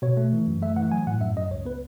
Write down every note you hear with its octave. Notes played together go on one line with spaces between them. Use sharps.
B2 C#5
A3
E3
F#2
A3 E5
E3 F#5
F#3 G#5
A2 F#5
F#2 E5
F#2 D#5
C#2 C#5
B3 B4